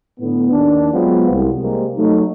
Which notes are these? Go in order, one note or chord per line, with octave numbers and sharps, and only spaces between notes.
A2 D3 B3
D#2 D#3 D4
F#3 G#3 B3 C4 F4
C2
C3 G3 G#3 A#3 C4
F#3 A3 D#4